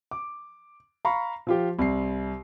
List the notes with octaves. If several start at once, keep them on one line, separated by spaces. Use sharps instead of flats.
D6
F5 A#5 B5 C#6
F3 F4 G4
C2 C7